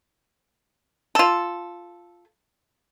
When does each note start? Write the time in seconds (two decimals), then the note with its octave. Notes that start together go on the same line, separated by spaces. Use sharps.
1.15 F4 A4